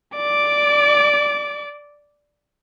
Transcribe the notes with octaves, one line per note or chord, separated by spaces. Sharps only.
D5 D6